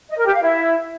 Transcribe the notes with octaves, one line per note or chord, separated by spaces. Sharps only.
D#5
A#4
G4
F5
E4